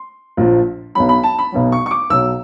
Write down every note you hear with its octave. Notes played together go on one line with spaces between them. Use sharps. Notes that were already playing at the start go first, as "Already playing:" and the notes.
Already playing: C6
A#1 A#2 F3
B1 B2 F#3 B5
B5
A5
B5
B1 B2 F#3
C#6
C#6
D6
B1 B2 F#3 E6